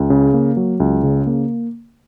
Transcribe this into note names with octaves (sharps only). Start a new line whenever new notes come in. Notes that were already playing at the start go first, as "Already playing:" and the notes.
Already playing: C#2
C#3
A#3
F#3
C#2
C#3
A#3